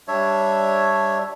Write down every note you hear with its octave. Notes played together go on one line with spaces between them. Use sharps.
G3 D4 C#5 E5